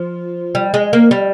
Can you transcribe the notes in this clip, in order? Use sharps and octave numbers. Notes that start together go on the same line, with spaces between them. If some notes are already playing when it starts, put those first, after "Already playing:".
Already playing: F3
G3
G#3
A#3
G3